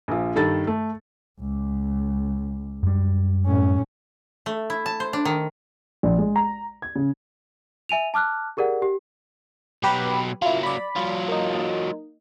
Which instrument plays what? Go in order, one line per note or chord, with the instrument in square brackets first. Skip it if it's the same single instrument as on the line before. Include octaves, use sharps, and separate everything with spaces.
[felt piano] A#1 F3
G2 D#3 A4 A6
A3
[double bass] C#2
[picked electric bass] F#2 G3
[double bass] A2 C#4
[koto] A3
E4
A5
C5
D4
D#3
[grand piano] A#1
G#3
A#5
G#6
C#3
[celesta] E5 G#5 D#7 F7
A5 D6 F6 F#6
G4 G#4 A#4 D5 F#5
G4
[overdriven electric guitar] B2 F#3 [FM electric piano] G4 B4 B5
[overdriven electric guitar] F#3 A#3 [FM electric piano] E4 F4
[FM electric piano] D5 B5
[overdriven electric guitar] F#3 F4
[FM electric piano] A#3 D#4